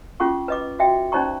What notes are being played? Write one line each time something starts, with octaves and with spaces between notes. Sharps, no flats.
C#4 F4 G#4 F#5 C#6
B4 D#5 D6
F#4 D#5 E5 G5
C#4 D#4 C5 D5 A#5 C#6